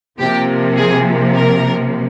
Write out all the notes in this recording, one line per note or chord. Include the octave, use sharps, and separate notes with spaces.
C3 F3 A#3 G4
G#4
A#4